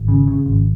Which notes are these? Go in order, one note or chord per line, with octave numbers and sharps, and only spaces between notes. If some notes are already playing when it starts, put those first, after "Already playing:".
Already playing: G#1
C#3
C#3
G#1